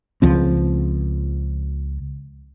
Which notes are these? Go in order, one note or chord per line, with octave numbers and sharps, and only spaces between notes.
C#2 F3 C4